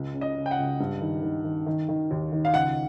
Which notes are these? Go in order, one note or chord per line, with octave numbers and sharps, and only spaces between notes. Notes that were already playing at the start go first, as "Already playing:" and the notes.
Already playing: C#2
C#3
D#5
C#3
G5
F#5
C#2
G2
D#3
D#3
D#3
D#3
D#3
D#2
D#3
F5
C#2 F#5